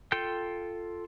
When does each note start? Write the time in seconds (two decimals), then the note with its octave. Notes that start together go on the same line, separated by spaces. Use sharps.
0.12 F4 A4 G5 G6